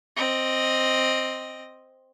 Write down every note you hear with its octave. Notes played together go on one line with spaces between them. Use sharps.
C4 D#5